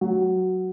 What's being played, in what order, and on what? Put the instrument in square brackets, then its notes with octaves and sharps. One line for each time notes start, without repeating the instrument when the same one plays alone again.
[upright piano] F#3